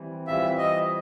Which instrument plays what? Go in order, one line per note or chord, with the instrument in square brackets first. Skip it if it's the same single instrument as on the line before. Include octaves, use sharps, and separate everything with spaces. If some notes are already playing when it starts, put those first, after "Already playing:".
Already playing: [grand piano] E3 G3 C4
[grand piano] E3 G3 C4 F4 [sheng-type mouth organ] E5
[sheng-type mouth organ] D#5